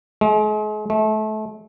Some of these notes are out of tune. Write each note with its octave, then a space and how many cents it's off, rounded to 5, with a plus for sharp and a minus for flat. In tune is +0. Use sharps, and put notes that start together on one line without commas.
G#3 +40
A3 -30